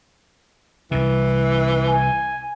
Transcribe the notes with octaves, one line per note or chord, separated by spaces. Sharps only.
C2 C3 E3
G#5